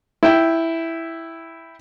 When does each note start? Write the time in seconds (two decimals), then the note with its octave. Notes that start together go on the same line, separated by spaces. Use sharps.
0.23 E4 E5 G5